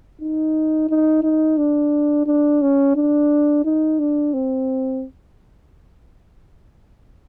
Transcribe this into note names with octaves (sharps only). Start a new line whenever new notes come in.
D#4
D#4
D#4
D4
D4
C#4
D4
D#4
D4
C4